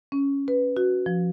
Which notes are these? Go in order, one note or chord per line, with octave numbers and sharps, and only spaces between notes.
C#4
B4
F#4
F3